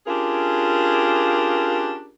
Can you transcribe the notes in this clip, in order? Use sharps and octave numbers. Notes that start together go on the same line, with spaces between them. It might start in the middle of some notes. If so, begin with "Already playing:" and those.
C#4 D4 F4 G4 G#4 A#4